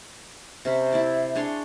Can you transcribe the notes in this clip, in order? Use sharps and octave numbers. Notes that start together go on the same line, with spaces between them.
C3 C#4 B5
E4 G4 D5
D4 G#4 C#5 C6